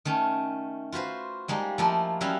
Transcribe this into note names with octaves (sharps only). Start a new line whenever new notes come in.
D#3 A3 C#4
F4 F#4 B4 C5
G3 G#3 A#3 D#4
F3 A3 A#3 E4 D#5
F#3 G3 C#4 E4 E5